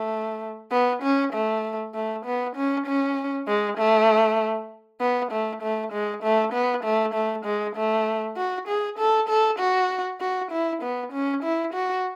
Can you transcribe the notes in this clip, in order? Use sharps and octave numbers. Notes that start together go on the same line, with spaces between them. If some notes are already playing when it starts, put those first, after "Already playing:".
Already playing: A3
B3
C#4
A3
A3
B3
C#4
C#4
G#3
A3
B3
A3
A3
G#3
A3
B3
A3
A3
G#3
A3
F#4
G#4
A4
A4
F#4
F#4
E4
B3
C#4
E4
F#4